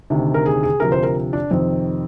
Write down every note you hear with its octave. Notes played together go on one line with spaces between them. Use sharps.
D2 C3 D#3
A#4
G#4
G#4
D2 C3 F3 A#4
C5
A#4
D4
F2 C3 D#3 C4